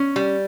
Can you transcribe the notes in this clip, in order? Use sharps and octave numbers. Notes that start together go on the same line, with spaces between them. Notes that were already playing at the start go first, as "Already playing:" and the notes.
Already playing: C#4
G3